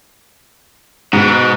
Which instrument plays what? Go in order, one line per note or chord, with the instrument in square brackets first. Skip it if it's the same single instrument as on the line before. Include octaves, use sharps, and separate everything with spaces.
[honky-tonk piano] G#2 [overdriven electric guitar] B2